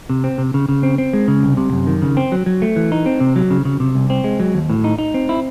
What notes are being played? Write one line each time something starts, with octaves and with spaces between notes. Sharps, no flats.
C3
C4
C3
C#3
C#3
C4
C4
G#3
C#3
C2
C3
F#2
D#3
C#3
C4
F#3
F#3
A3
E3
D#4
C4
C3
F#3
C#3
C#3
C3
C2
C4
G#3
F#3
D#2
A2
D#4
D#4
C4
E4